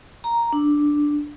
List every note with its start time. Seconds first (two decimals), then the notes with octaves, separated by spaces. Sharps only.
0.24 A#5
0.53 D4